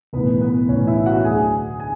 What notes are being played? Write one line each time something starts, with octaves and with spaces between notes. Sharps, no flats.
B1 A2 E3 B3 B4
B3 B4
B1 A2 E3 C#4 C#5
E4 E5
F#4 F#5
D2 D3 G#4 G#5
G#5